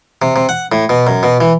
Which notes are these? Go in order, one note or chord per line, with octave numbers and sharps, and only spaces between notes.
C3
C3
F#5
A2
B2
F#2
B2
E3